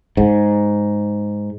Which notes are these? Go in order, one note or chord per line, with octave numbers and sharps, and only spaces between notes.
G#2